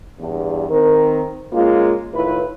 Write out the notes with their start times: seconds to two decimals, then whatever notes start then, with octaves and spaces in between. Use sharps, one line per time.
0.20 E2 G2
0.69 D#3 C4 A#4
1.53 G#3 A#3 C#4 F4
2.13 A2 D#3 E4 F4 B4